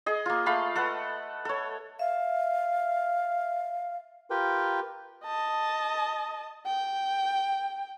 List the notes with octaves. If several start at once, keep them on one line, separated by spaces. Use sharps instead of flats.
G#4 D#5
A#3 F4
A3 F5 A5 B5
A4 B4 F#5
A4 C#5
E5 F5
F4 G4 A#4 B4 G5
D#5 A5
G5